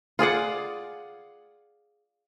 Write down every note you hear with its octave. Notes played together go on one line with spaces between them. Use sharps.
F4 G#4 D5 F#5